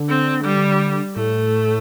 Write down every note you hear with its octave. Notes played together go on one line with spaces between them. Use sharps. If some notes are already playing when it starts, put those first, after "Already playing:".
Already playing: D3
C4
G3
A2 A3